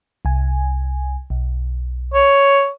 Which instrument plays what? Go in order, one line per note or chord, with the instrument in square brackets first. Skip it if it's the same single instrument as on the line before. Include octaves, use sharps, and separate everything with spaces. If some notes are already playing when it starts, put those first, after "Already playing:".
[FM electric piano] C2 G#5
B1
[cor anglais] C#5